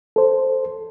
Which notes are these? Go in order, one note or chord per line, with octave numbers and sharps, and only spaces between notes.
A4 C5